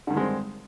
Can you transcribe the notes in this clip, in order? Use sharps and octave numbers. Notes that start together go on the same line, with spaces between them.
G2 D3 D#3 G#3 C4